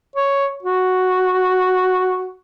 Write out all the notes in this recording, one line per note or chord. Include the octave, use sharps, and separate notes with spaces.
C#5
F#4